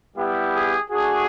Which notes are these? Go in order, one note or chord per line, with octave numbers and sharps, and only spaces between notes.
G3 B3 E4 G4
G#4
A3 D4 F#4 G#4